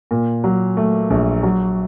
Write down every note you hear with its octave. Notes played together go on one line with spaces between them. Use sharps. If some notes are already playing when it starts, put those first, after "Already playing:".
A#2
F#3
A3
A#1
F#3